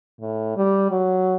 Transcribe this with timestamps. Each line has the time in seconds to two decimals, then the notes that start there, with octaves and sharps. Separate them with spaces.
0.21 A2
0.56 G3
0.91 F#3